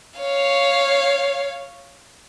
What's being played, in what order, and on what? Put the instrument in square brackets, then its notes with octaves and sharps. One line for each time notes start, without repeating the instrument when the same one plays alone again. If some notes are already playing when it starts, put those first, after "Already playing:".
[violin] C#5 F5